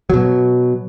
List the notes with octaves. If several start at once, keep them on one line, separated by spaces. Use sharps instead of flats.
B2 F#3